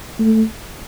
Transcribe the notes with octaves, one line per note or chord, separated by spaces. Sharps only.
A3